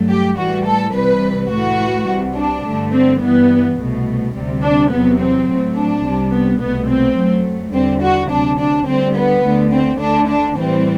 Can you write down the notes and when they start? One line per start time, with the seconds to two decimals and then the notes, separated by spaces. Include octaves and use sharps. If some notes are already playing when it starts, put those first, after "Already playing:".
Already playing: G2 F#3 A3
0.10 G4
0.38 A2 E3 G3 F#4
0.66 A4
0.95 C2 C3 E3 G3 B4
1.51 A2 E3 A3 F#4
2.08 C2 C3 G3
2.36 D4
2.64 G2 D3 A3
2.93 C4
3.21 G2 E3 G3 B3
3.77 C2 B2 A3
4.34 D2 C3 G3
4.63 D4
4.91 E2 C3 F#3 B3
5.19 C4
5.48 A2 F#3 A3
5.76 D4
6.04 C2 C3 G3
6.32 B3
6.60 C2 B2 A3 B3
6.89 C4
7.17 F#2 F#3 A3
7.73 E2 D3 G3 C4
8.02 F#4
8.30 D2 C3 F#3 D4
8.59 D4
8.87 D2 D3 G3 C4
9.15 B3
9.43 D2 D3 A3
9.72 C4
10.00 D2 D3 A3 D4
10.28 D4
10.56 A2 E3 G3 C4